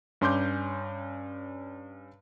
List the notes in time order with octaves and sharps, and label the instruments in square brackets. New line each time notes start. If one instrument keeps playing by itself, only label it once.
[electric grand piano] G2 C#4 C6 D6 G6